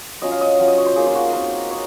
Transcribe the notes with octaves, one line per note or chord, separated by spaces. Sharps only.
F#3 C#4 F4 D#5
F5
D#5
F#3 C#4 F4 F#5
D#5
C#5
C5
A#3 D#4 G#4
F4
F#4
G#4
F#3 C4 D#4 A#4
A#3 C#5